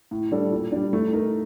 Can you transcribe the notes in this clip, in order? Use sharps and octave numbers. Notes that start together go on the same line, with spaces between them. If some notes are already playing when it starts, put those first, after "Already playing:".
A2
G3 D4 A4
A#2
G3 D4
A3
D#4 A#4